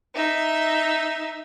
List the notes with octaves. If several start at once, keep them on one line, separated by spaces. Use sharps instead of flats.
D#4 E5